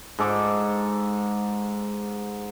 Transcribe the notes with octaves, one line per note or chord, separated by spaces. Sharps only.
G#2 A4 D6